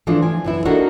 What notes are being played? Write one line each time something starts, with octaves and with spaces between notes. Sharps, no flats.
E3 F3 A3 D4 F4
G#5
F#2 E3 E4
A#3 D4 D#4 F#4 A4 A#4